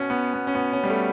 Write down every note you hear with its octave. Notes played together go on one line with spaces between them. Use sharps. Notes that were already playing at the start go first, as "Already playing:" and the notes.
Already playing: B2 C#4
B3
B3
C#4
B2 B3
C#4
G3
A3